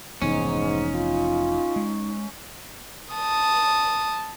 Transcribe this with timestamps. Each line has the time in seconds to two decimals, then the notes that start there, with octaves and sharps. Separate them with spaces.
0.22 F1 G#2 E3 B3 C#4 D#4
0.95 F4
1.76 G#3
3.14 A5 D#6